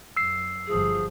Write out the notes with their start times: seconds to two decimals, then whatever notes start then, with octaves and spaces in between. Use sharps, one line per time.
0.17 F#2 E6 C7
0.67 G1 F3 G#4